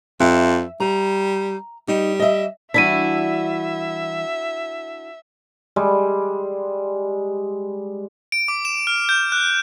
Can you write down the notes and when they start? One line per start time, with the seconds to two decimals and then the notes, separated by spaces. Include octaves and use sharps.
0.20 F2 E5
0.80 G3 A#5
1.88 G3 D#4
2.20 D#5 E5
2.74 E3 G3 D4 E4 F#4 E5 B6 D#7
5.76 G3 G#3
8.32 D7
8.48 D6
8.65 E7
8.87 F6
9.09 G6
9.32 F#6